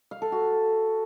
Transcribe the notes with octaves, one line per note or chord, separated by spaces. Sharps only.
F5
A4
F#4